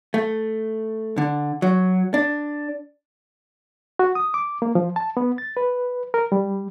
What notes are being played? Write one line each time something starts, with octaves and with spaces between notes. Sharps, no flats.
A3
D3
F#3
D4
F#4
D#6
D6
A#3
F3
A5
B3
A6
B4
A#4
G3